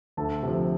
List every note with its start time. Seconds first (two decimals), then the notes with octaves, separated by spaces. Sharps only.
0.17 D2 A4 A5
0.43 C3 F3